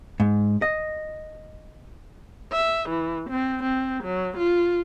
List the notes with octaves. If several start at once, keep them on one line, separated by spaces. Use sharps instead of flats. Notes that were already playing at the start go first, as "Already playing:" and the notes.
G#2
D#5
E5
E3
C4
C4
F#3
F4